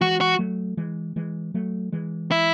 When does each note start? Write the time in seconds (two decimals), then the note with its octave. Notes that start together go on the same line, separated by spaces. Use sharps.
0.01 E3 G#3 F#4
0.21 F#4
0.39 F#3 A3
0.77 E3 G#3
1.16 E3 G#3
1.54 F#3 A3
1.93 E3 G#3
2.31 E4